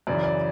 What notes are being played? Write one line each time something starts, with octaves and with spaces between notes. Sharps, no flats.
F#2 C#3 E3 D5
D5